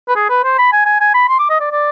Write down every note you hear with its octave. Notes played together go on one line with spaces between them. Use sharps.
B4
G#4
B4
C5
B5
G#5
G#5
G#5
B5
C6
D6
D#5
D5
D5